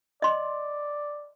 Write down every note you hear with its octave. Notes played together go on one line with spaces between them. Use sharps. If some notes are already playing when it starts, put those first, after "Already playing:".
D5 D#5 C6